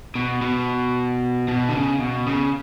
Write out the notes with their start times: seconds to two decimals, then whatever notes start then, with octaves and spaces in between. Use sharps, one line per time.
0.15 B2
0.42 B2
1.48 B2
1.69 D3
1.74 C#3
2.00 B2
2.27 C#3